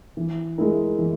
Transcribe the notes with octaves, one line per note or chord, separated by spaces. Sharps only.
E3
G#3 E4 A#4
E3